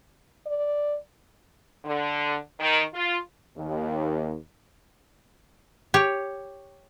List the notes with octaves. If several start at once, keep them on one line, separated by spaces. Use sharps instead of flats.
D5
D3
D#3
F4
D#2
G4 C#5